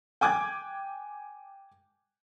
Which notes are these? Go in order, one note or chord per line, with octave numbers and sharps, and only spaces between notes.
G5 G#5 D6 F#6 G#6